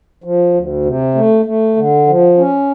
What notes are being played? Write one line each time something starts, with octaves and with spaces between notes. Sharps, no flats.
F3
D2
C3
A3
A3
D3
F3
C#4